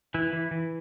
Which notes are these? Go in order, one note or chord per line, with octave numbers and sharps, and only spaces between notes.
E3 E4
E3
E3